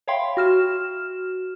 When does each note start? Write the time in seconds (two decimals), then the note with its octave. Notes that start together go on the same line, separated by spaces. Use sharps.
0.08 C#5 E5 F5 G5 B5 C6
0.37 F#4 F6 E7